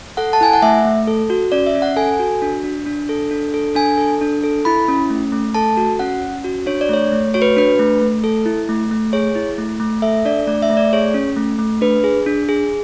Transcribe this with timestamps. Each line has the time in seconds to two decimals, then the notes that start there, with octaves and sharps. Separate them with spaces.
0.17 A4 F#5
0.33 A5
0.41 E4 G#5
0.53 F#5
0.62 A3 E5
0.85 A3
1.07 A4
1.30 F#4
1.52 C#4 D5
1.66 E5
1.75 C#4
1.82 F#5
1.96 A4 G#5
2.20 F#4
2.42 D4
2.64 D4
2.86 D4
3.09 A4
3.31 D4
3.54 A4
3.75 D4 G#5
3.98 A4
4.21 D4
4.44 A4
4.65 E4 B5
4.88 C#4
5.10 A3
5.32 A3
5.55 A4 A5
5.77 F#4
5.99 C#4 F#5
6.22 C#4
6.44 F#4
6.66 D4 C#5
6.81 D5
6.89 A3 C#5
7.12 A3
7.34 F#4 C#5
7.42 B4
7.57 D4 B4
7.80 A3
8.01 A3
8.24 A4
8.46 E4
8.69 A3
8.91 A3
9.13 G#4 C#5
9.35 E4
9.58 A3
9.80 A3
10.02 A4 E5
10.25 D4 D5
10.47 A3 D5
10.62 E5
10.70 A3
10.77 D5
10.93 G#4 C#5
11.14 C#4
11.37 A3
11.59 A3
11.81 D4 B4
12.04 G#4
12.26 D4
12.49 G#4